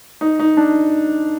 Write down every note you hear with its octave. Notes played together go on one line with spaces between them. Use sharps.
D#4
D#4
D4